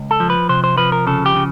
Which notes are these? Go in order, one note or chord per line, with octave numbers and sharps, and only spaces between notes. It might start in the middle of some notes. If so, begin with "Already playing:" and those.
Already playing: C#2
A4
F3
B4
C3 C5
C5
F3 B4
A#4
C#3 A4
G4
C#3